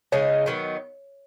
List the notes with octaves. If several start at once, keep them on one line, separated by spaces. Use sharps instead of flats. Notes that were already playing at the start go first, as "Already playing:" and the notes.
C#3 G#3 D#4 C#5
D#3 F#3 B3